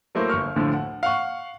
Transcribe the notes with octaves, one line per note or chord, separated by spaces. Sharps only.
F#3 A3 A#3 E4 C5
G1 C#6 F6
D2 A2 D3 F3
F#5
F5 F#5 C#6